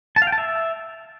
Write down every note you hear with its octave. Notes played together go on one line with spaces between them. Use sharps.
A5
F5
G5
A5
E5